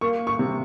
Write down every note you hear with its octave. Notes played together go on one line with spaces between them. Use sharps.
A#3 C#6
C#6
C3